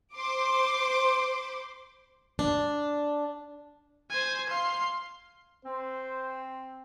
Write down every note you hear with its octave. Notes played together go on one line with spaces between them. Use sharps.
C5 C6 D6
D4
C5 G#5
F5 C6
C4 C5